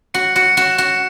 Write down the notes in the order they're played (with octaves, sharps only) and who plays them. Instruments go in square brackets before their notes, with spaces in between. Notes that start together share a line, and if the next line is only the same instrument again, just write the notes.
[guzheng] F#4 [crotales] C#7
[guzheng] F#4 [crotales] C#7
[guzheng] F#4 [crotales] E7
[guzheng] F#4 [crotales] C#7